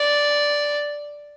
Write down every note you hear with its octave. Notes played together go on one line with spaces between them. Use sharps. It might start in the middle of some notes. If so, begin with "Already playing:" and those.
Already playing: D5